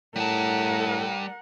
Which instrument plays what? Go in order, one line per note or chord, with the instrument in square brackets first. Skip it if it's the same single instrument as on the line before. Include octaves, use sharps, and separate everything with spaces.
[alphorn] A2 [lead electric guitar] G3 A5 [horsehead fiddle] A#4 F#5